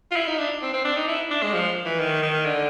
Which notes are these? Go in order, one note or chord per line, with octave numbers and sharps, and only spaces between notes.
F4
E4
D#4
D4
C4
C4
D4
D#4
E4
D4
G#3
F3
E3
D#3
D#3
D3